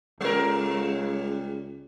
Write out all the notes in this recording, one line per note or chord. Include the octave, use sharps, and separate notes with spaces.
C#2 G3 A#4